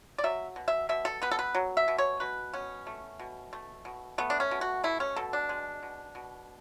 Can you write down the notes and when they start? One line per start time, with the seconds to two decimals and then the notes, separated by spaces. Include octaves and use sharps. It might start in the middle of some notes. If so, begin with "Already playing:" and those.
0.18 D5
0.24 F#3 E5
0.56 B2
0.68 E5
0.89 B2 E5
1.05 A4
1.22 B3 B4
1.31 A4
1.39 B4
1.55 F#3
1.77 E5
1.88 B2
1.98 C#5
2.20 B2 B4
2.54 B3 C#4
2.87 A3
3.19 B2
3.53 A3
3.85 B2
4.18 A3 B3
4.30 D4
4.40 C#4
4.51 B2
4.61 F#4
4.84 A3 E4
5.00 C#4
5.16 B2 A4
5.33 D4
5.49 G#3
5.83 B2
6.15 B2